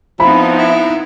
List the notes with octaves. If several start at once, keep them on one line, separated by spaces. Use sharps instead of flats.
F3 B3 C4 D#4 E4 B5
E4